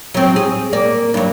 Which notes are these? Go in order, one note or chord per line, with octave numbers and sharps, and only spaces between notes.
F#3 C4
G#4
A#3 D5
G2 F#3